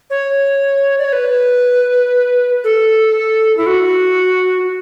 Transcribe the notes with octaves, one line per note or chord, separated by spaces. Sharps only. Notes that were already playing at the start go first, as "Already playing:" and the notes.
C#5
D5
C#5
B4
A4
E4
F#4